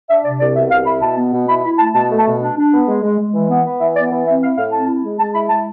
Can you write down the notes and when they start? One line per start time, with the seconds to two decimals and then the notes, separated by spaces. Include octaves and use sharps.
0.09 D4 E5
0.24 C3 D5
0.39 C2 D5
0.55 B2 E5
0.71 C2 F5
0.86 E4 B5
1.01 B2 A5
1.18 B3
1.32 B2
1.48 E4 B5
1.63 E4 B5
1.79 A3 A5
1.94 B2 A5
2.09 A3
2.18 A5
2.26 B2
2.40 D4
2.57 D4
2.72 B3
2.87 G#3
3.02 G#3
3.18 G#3
3.33 E3
3.49 B3
3.65 B3
3.80 E3 E5
3.95 B3 D5
4.11 E3
4.26 C4 E5
4.42 E4 F5
4.57 A2 F5
4.73 C4 A5
4.88 E4
5.03 G#3
5.20 G#3 A5
5.34 E4 B5
5.50 G#3 A5